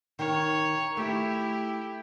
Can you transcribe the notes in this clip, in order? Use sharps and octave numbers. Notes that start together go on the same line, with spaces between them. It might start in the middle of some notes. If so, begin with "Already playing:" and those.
D#3 C#5
A3 E4 G4